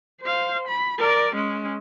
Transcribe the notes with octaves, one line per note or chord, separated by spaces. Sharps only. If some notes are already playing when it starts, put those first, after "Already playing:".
C5 F5
B5
A#4 D5
G#3 C#4